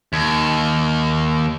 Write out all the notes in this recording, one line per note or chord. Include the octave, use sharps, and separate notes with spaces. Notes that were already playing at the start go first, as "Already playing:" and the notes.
D#2